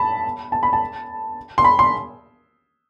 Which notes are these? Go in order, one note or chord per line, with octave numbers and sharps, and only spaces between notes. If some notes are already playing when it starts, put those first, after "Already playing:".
Already playing: A5 B5
A5
B5
A5
C6
B5
C6